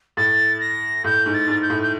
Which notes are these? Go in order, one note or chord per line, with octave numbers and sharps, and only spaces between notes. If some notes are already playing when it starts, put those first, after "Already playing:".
A2 A6
A#6
A2 G6
G#2
A6
G#2
G6
A2
G6